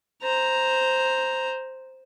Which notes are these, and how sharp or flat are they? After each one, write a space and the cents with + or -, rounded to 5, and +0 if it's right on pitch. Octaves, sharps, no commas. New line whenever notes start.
C5 +0 A#5 +0